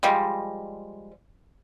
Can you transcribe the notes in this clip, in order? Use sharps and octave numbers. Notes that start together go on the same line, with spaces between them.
F3 G3 G#3